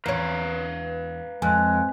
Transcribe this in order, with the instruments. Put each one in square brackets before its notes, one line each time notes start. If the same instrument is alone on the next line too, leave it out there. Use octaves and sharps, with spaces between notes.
[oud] E2 C#5 [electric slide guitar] B4 F5 A#5
[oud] F2 [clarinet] G#3 [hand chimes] G#5 F#6